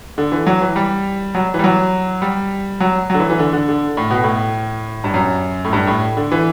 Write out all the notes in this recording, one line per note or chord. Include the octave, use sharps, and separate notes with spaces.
D3
E3
F#3
E3
G3
F#3
E3 G3
F#3
G3
F#3
D3 F#3
E3
E3
D3
D3
D3
A2
B2
A2
G2
F#2
A2
G2
A2
D3
E3